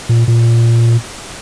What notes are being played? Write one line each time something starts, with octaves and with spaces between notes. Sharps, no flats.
A#2
A#2